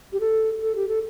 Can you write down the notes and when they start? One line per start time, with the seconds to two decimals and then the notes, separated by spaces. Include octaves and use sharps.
0.13 G4
0.20 A4
0.62 A4
0.75 G4
0.88 A4